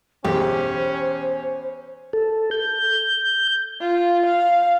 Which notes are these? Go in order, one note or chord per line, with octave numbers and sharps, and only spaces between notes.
B1 E2 C#4 G4 C5
A4
G6
F4
F5